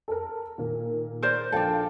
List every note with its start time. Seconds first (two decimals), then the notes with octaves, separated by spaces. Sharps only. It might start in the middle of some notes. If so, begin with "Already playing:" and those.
0.08 A4 A#4
0.58 A#2 D#3 A#3
1.23 A#4 C5 D5
1.52 A#1 D4 A4 F5 G5